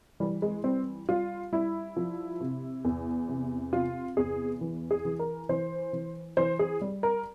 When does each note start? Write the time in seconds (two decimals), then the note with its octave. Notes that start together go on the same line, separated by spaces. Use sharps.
0.20 E3 G3
0.42 G#3
0.64 G3 C4
1.09 G3 F4
1.53 G3 E4
1.97 F3
2.41 C3
2.85 E2
3.29 C3
3.73 C3 F4
4.17 E2 G#4
4.61 E3
4.91 G#4
5.05 E3
5.19 A#4
5.49 E3 C5
5.93 E3
6.37 E3 C5
6.59 G#4
6.81 G3
7.03 A#4